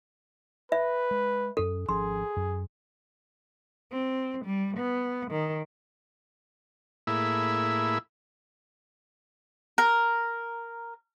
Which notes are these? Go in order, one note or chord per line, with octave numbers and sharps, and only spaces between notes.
B4 E5
G#3
F#2 C#4 A4
G#1 F3 C#4 G#4 C6
F#2
C4
G3
B3
D#3
A2 A#3 E4 G#4 E5 B5
A#4